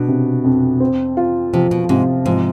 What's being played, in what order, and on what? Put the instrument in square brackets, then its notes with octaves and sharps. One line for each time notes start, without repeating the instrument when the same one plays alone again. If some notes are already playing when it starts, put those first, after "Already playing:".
Already playing: [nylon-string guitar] B2 [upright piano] D4
[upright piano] C3
F2
C4
F4
[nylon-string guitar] C3 [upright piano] F3
[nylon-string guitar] B2
[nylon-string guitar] G#2 [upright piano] C3
[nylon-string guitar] G#2 [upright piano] F3